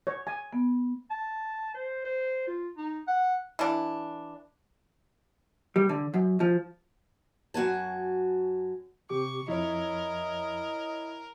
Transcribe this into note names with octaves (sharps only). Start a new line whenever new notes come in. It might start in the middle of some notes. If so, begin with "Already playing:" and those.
C#5
G#5
B3
A5
C5
C5
F4
D#4
F#5
E3 D4
G3
D3
F#2
F3
F#2 F#4 G#5 A5
C3 G4 C#6 D6
F2 E4 A#4 C#5 D#5